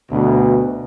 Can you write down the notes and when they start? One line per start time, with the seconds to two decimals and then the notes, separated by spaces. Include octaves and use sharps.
0.11 D2 B2